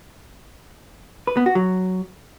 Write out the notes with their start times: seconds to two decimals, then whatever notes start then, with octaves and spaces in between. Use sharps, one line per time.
1.27 B4
1.37 B3
1.46 F#4
1.55 F#3